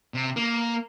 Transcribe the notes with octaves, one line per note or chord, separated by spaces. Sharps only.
C3
A#3